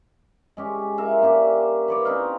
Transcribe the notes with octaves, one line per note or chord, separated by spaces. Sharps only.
G#3 C#4 G4
F4 A#4 E5 F5
A#3 C#4 D4 G4
B4 C#5 D5
C4 C#4 D#4 F5